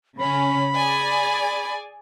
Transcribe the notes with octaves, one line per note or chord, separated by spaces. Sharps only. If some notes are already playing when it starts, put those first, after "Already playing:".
C#3 C#4 B5
G#4 D5 G#5